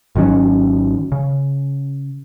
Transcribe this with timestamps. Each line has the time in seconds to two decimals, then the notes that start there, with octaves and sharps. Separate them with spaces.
0.16 G#1 D#3 F#3 C#4
1.12 C#3